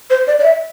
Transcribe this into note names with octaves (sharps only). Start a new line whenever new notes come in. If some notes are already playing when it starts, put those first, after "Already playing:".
C5
D5
D5
E5